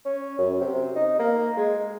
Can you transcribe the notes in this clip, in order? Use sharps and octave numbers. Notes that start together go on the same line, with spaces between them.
C#4
F#2
C3
D#4
A#3
G#3